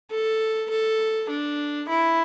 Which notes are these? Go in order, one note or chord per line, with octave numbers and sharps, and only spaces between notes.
A4
A4
D4
E4